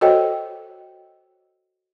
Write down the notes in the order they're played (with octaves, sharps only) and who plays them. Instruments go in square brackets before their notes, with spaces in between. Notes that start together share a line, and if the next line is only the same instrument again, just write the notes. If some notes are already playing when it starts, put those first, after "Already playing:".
[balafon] F#4 A4 C5 C#5 D#5 G5